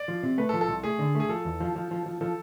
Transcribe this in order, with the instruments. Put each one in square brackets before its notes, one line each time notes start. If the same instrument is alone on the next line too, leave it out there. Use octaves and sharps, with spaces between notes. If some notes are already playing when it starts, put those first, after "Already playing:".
Already playing: [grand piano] D5
[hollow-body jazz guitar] F3
C3
[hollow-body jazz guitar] A3 [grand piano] B4
[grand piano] A4
[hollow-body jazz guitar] F3
[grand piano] A4
[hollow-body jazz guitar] C2
[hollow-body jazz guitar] A3 [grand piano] G#4
[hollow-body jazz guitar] D3
[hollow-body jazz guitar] A3 [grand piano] G#4
[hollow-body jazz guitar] F3 [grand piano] A4
[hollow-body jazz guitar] E2
F3
F3
F3
F3
[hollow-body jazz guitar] F3 [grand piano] A4